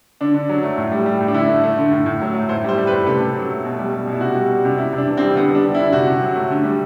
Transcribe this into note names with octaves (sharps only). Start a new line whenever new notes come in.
D3 D4
D3
F#3
A3
A2
G3
G3
A2
D4
D3 E4
A3
A3
D3
A2
A2
F#3
A3
A2 C5
G3 C5
G3
B4
A2
C3 A4
C3
F#3
A3
B2
G3
G3
B2
E4
C3 F#4
G3
G3
C3
C3 E4
C3
D4
E3
C4
G3
D3 B3
G3 D4
G3
E4
D3
C3 F#4
C3
F#3
A3
D3
G3